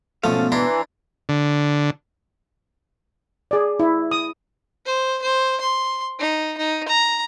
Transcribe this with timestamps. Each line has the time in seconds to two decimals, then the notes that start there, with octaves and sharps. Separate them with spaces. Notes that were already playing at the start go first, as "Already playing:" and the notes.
0.24 E2 G#2 B2 F3 A3 C#4 A4 F5
0.52 E3 D4 E4 A#5 C6
1.29 D3
3.51 G#4 D5
3.80 E4
4.11 D#6
4.86 C5
5.22 C5
5.61 C6
6.19 D#4
6.58 D#4
6.88 A#5